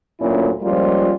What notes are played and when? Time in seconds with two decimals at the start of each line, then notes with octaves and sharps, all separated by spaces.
0.20 D2 A#2 F#3 C#4 E4
0.63 F3 G3 G#3 A#3 C#4 F4